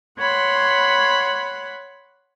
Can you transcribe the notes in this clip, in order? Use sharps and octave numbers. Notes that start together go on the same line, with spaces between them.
C#5 F#5 B5 C6